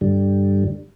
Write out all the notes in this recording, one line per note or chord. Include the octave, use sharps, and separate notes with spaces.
G2 D3 G3